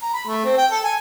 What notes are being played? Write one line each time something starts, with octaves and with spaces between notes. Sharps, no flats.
A#5
B5
A3
C4
G5
A4
G#5